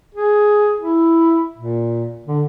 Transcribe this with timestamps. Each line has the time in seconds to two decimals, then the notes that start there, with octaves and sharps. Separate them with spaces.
0.15 G#4
0.81 E4
1.57 A#2
2.27 D3